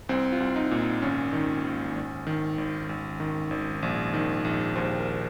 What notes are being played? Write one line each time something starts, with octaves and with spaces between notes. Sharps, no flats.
C2 C4
F4
C2
D#4
A#2
D#4
G#1 C#4
D#3
G#1
G#1
D#3
G#1
G#1
D#3
G#1
A#1
D#3
A#1
D#2 C5
A#4